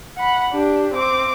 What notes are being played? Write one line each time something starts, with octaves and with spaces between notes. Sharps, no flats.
F#5 B5
D4 G4
C4 D6